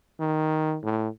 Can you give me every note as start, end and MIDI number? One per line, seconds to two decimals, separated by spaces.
0.20 0.78 51
0.83 1.09 45